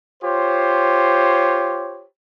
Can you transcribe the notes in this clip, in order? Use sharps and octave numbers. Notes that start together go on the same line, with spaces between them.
F4 G4 C5 C#5